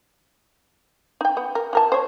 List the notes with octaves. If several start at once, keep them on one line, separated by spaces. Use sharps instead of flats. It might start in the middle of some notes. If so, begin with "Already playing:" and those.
D#4 G5
B3
A#4
E3 A#4 A5
C5 C#5